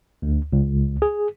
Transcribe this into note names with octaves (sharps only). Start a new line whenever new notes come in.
D2
C#2
G#4